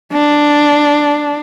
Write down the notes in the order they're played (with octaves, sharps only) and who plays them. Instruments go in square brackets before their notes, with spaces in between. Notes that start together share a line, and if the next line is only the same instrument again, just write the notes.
[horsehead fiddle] D4